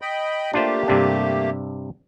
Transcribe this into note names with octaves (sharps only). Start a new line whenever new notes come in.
D#5 G5 B5
A3 A#3 D4 F4 G4 C5
G2 C3 D4